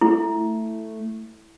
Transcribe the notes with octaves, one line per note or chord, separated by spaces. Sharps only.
A3 E4